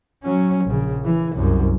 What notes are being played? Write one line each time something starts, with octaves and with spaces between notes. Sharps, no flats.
F#3 C#4
A#1 C#3
E3
C2 F#2